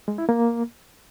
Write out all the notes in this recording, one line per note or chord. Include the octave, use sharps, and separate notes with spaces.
G#3
E4
A#3